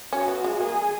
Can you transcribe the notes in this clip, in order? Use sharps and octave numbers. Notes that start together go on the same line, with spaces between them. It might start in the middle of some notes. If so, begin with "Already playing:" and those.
C#4 F#4
B3
G#3
A#3 G#4